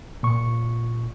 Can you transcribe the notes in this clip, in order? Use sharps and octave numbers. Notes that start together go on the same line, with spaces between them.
A#2 C#6